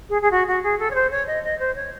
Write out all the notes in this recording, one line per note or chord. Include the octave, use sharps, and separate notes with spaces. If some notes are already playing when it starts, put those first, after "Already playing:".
G#4
G#4
F#4
F#4
G#4
A4
C#5
C5
C#5
D#5
D#5
C5
C#5